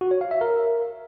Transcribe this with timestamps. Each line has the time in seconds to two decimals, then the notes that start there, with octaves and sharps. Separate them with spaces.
0.01 F#4
0.11 C#5
0.21 F5
0.31 E5
0.41 A#4